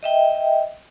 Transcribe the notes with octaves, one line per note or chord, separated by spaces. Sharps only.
D#5 E5 G5